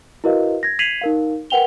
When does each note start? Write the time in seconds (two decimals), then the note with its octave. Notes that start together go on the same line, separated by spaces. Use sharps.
0.24 E4 F#4 A#4 B4 D#5 F5
0.63 G#6 A#6
0.79 G#6 B6 C7 D#7 F7 F#7
1.01 D#4 A#4 F5
1.50 A#4 B4 F#5 G5 F7 G7